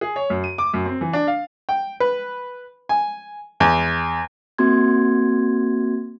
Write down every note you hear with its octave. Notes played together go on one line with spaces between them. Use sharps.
G#4
C#5
F#2
D#7
D6
F#2
C4
E3
D4
F5
G5
B4
G#5
E2
A#3 C4 F#4 C6 G#6